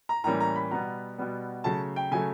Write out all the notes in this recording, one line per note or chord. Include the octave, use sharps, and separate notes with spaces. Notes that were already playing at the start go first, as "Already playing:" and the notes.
A#5
A2 E3 G3 A#3 C#4 A#5
A#5
B5
B2 G3 B3 A#5
B2 G3 B3
C#3 F#3 A3 A5
G5
C#3 F#3 A3 G#5